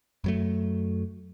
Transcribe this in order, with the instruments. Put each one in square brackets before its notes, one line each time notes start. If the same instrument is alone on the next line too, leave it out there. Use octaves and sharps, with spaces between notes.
[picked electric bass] F#2 F#3 A3